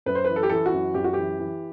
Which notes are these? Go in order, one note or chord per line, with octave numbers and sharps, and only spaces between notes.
F#2 B4
C5
E3 B4
A4
G4
E3 A4
F#4
F#2
F#2 G4
F#4
E3 G4
E3